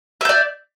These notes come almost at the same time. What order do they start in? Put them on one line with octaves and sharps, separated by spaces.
E5 G6 D5